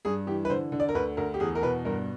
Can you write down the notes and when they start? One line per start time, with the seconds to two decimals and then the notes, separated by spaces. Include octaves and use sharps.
0.05 G2 G#4
0.27 E3 G4
0.45 B4
0.50 D3 C5
0.72 D3
0.80 D5
0.89 A#4
0.95 D2 B4
1.17 D2 A#4
1.34 G4
1.40 E2 G#4
1.55 A#4
1.62 B2 B4
1.85 G2 A#4